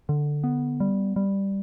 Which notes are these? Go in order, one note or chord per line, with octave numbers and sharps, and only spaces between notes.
D3
B3
G3
G3